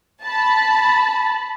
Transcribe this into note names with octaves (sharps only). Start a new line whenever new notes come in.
A5 B5